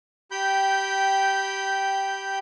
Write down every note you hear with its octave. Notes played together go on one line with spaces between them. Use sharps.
G4 G5 B5 G6